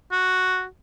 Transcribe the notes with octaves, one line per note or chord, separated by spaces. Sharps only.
F#4